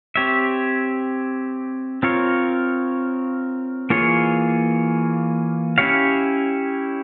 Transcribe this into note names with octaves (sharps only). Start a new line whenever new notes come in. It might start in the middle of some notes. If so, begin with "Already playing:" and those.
C4 G4 C#5 E5
C4 F4 A#4 C#5
E3 A#3 F4 G#4 C#5
C#4 E4 G4 C#5 F5